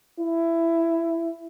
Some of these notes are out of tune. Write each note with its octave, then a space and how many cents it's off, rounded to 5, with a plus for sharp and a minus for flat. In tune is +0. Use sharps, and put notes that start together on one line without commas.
E4 +15